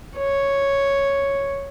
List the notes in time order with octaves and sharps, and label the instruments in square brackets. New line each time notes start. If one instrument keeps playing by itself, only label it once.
[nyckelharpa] C#5